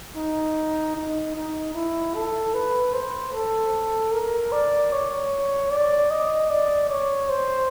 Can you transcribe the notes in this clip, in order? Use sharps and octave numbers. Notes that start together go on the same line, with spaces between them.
D#4
D#4
D#4
E4
A4
B4
C5
A4
A#4
D5
C#5
D5
D#5
D5
C#5
C5